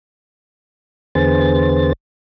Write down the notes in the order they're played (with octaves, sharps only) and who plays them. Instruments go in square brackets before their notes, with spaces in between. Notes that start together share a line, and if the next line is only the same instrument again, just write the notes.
[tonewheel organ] E2 D3 B3 G#4 C5 A6